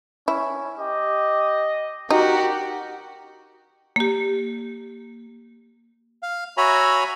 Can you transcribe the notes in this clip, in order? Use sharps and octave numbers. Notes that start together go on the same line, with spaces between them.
C#4 E4
G4 D#5
D#4 F#4 G4 A#4
A#3 G4
F5
F#4 C#5 E5 G#5 A#5 B5